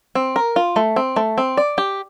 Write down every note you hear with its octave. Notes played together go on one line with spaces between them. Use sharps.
C4
A#4
F4
A3
C4
A3
C4
D5
G4